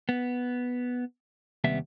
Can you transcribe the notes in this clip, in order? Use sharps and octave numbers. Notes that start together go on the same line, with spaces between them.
B3
D#2 C3 G3 B3 E5